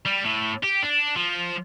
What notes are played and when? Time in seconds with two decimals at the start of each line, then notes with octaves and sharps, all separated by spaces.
0.06 G3
0.24 A2
0.63 G4
0.83 D4
1.16 F3